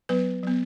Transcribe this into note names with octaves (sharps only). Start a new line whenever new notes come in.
F#3 B3 B4
F#3 B3